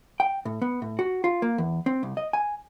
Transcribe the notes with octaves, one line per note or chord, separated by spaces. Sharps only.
G5
A2
B3
A2
F#4
F4
A#3
E2
C4
C2
D#5
G#5